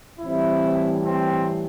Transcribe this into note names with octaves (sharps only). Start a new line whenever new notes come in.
A2 E3 G3 C4 E4
C4